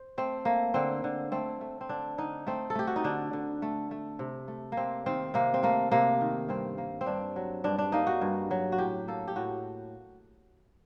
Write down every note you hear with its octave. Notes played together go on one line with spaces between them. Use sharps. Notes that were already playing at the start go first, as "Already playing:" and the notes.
Already playing: C5
A3 C4
A3 A#3
D3 C4
D3
A3 C4
A3
C4
D3 D4
D3 D#4
A3 C4
A4
A3 G4
F#4
D#4
D3 D4
D3
A3
A3
C3
A3
A#3
C3 C4
D#3 C4
C3 A#3
C4
A3 A#3
C3 A#3
D#3
G2 C4
A#3
C4
G2 D4
F#3
G2 D4
D4
A#3 D#4
F#4
G2
F#3
F#4
A2 G4
A#3 A4
G4
A2 F#4